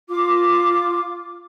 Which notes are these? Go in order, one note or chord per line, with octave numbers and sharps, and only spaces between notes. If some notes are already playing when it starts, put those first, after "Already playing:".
F4 D6